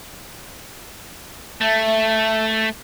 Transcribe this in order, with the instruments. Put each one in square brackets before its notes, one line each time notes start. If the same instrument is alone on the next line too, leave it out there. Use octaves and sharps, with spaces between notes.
[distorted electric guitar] A3 [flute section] E5 A5